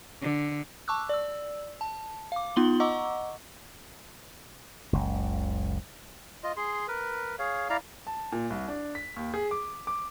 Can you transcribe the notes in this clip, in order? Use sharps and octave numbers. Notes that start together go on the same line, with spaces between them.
D3
A5 C#6 D6 E6 F#6
D5 E6
A5
F5 D6
B3 D#4 F4 C6 F#7 G7
D#5 F#5 A#5 C#6 D6 E6
F#1 C#2
F4 D#5
G#4 C6
A#4 B4
G#4 C#5 F5
E4 D5 F5 A#5
A5
A#2
C2
D4
B6
D#2
G#4
D6
D6